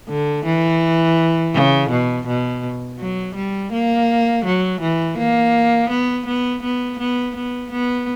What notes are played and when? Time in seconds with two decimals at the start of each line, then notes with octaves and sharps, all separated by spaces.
0.09 D3
0.45 E3
1.54 C#3
1.90 B2
2.27 B2
2.99 F#3
3.35 G3
3.72 A#3
4.45 F#3
4.81 E3
5.18 A#3
5.90 B3
6.26 B3
6.63 B3
6.99 B3
7.36 B3
7.71 B3